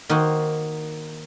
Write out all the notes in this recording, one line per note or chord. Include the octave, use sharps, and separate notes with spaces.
D#3 A#3 D#4 F#4 C5